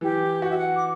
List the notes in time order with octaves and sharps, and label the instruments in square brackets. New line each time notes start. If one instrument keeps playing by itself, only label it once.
[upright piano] E3 [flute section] G4
[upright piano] F#4 [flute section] F#5
[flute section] E5
F#5
D6